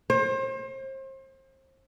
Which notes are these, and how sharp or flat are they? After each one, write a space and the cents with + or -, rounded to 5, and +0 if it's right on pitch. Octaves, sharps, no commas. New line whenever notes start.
C5 +35